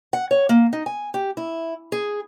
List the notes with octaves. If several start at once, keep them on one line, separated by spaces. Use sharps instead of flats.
F#5
C#5
A#3
D#4
G#5
G4
E4
G#4